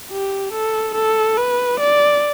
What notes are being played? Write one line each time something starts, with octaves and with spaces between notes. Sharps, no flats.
G4
A4
A4
B4
D5